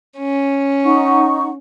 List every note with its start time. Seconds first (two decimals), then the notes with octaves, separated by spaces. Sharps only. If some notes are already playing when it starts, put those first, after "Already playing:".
0.18 C#4
0.84 D#4 F#5 C#6